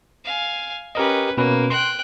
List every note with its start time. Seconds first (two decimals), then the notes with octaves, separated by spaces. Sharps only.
0.25 F5 G#5
0.95 C#4 G4 A#4 B4 D#5
1.38 B2 A#3 C#4 B4
1.70 G5 C6 F#6